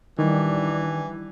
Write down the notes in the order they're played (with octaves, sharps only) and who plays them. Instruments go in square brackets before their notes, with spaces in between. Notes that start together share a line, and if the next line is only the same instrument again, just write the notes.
[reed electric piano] D#3 [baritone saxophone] E3 [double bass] G3 D4